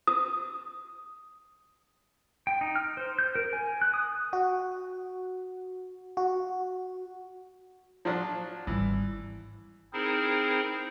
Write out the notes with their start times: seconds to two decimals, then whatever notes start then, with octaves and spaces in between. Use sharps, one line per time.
0.07 D#6
2.47 G5
2.61 D#4
2.76 F6
2.97 C5
3.19 G6
3.35 A#4
3.53 G#5
3.82 F#6
3.94 D#6
4.33 F#4
6.17 F#4
8.05 F3 F#3 D4
8.67 G#1 E3 G3
9.93 C4 D#4 E4 G#4 A#4 C5